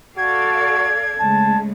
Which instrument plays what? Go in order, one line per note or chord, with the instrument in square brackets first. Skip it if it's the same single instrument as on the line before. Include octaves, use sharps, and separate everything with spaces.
[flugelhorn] F#4 [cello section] A4 D5 F5 [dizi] G#6
[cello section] C#3 G#3 A3 [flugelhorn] A5